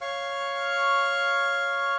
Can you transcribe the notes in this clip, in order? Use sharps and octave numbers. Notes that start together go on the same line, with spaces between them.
C#5 F5 C#6 F6